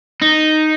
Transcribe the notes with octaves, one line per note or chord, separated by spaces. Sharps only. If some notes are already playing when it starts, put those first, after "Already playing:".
D#4